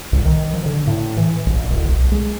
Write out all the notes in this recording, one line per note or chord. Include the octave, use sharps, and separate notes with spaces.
C2
D#3
F3
D3
A2
E3
A#1
D1
B1
G#3